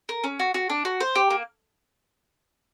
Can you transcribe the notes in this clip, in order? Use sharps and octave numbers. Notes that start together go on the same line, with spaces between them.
A#4
C#4
F#4
F#4
D4
F#4
C5
G4
A#3